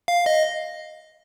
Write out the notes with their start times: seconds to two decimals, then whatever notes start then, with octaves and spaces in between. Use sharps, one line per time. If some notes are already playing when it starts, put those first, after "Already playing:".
0.08 F5
0.26 D#5